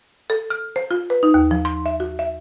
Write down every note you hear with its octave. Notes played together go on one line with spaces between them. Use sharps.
A4
F6
C5
F4
B4
D#4
D#2
F3
C6
E5
F#4
E5